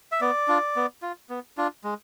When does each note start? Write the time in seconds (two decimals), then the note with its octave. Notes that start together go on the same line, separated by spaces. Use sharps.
0.12 E5
0.21 B3 D5
0.48 D4 F4
0.76 B3
1.02 F4
1.30 B3
1.58 D4 F4
1.84 G#3